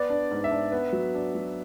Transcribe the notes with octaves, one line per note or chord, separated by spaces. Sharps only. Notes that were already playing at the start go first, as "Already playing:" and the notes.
Already playing: B3 D5
D4
G#2
E5
D4
B3
F#3
D4
F#3